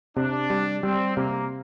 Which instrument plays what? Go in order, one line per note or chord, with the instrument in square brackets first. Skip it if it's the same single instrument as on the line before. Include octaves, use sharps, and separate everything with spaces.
[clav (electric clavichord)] C3 [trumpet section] D4
[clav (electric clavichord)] G3
[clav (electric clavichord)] G3 [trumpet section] C4
[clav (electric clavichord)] C3 [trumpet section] A#3